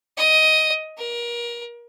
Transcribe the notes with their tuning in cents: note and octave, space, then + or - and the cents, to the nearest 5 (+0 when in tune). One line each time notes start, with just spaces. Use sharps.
D#5 +10
A#4 +30